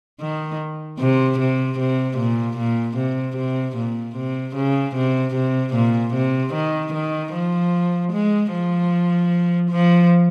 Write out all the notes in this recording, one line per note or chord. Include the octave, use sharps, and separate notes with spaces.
D#3
C3
C3
C3
A#2
A#2
C3
C3
A#2
C3
C#3
C3
C3
A#2
C3
D#3
D#3
F3
G#3
F3
F3